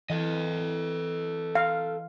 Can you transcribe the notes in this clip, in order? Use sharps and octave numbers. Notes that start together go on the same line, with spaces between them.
E3 A4 D#5
F5